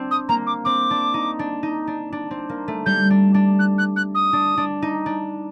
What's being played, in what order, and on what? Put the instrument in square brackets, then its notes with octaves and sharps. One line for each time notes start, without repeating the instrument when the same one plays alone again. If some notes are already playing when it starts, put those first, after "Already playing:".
Already playing: [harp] C4 D4
[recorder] D#6
[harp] A#3 [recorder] A#5
[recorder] D6
[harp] C4 [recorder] D6
[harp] D4
D#4
D4
D#4
D4
D4
C4
A#3
A3
[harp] G3 [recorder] G6
[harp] D4
D4
[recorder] F#6
F#6
F#6
D#6
[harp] D4
D4
D#4
D4